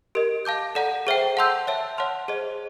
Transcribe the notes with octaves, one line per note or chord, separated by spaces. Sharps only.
G4 A#4 D#5
F5 A5 D6 G6
A4 D5 F#5 A#5
G#4 C5 E5 G5
F#5 A5 C6 E6 G6
C#5 E5 A5
C#5 F#5 A5 C6 F6
G#4 C5 D#5